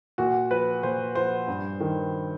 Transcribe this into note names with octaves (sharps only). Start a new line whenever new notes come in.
A#2 F#4
F3 B4
A#2 C5
F3 C5
G2
D#3